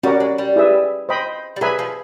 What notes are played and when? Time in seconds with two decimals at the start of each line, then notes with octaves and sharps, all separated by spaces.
0.03 G3 C#4 F#4 A#4 D5
0.20 G#3
0.38 G3
0.56 E4 G#4 B4 E5
1.09 C5 D#5 G5 B5
1.56 G3
1.61 F#3 G#4 B4 E5 G#5 B5
1.79 F3